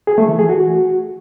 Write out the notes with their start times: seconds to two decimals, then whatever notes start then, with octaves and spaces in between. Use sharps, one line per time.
0.07 G#4
0.18 A3
0.28 E3
0.39 G#4
0.49 F#4